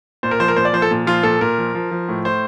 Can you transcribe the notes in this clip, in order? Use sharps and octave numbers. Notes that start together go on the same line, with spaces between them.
A#2 C5
A#4
F3 C5
A#4
A#2 C5
D5
F3 C5
A4
A#2
F3 F4
A#2 A4
A#2 A#4
F3
F3
F3
A2
A2 C5